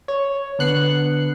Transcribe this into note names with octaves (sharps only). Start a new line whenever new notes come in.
C#5
D3 B3 F#6 C7 C#7